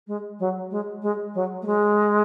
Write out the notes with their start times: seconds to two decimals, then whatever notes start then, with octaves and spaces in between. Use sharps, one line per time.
0.07 G#3
0.39 F#3
0.70 G#3
1.02 G#3
1.34 F#3
1.62 A3
1.66 G#3